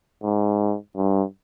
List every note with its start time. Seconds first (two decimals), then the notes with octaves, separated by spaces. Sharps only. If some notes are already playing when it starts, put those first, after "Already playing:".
0.23 G#2
0.97 G2